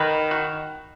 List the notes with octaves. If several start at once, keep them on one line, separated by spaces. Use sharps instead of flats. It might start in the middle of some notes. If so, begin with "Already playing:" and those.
Already playing: D#3 B4
F#4